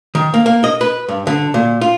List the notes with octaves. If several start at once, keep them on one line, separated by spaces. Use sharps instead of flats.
D#3
A#3
A#3
D#5
B4
G2
D3
A#2
F4